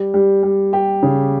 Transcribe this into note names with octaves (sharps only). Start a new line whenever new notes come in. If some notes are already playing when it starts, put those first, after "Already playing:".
Already playing: G3
G3
G3
G4
C#3